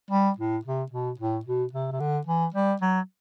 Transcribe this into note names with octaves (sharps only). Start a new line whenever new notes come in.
G3
A2
C3
B2
A2
B2
C3
C3
D3
E3
G3
F#3